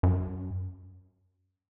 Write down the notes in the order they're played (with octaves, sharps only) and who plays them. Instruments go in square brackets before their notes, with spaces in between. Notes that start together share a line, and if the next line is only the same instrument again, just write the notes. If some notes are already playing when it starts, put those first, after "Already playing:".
[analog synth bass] F#2